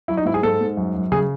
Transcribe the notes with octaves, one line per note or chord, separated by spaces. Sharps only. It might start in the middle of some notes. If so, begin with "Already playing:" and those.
F#3 E4
D#4
G#2 E4
G#4
G#2 A4
G#2
F#2
F#2
C#3 G#4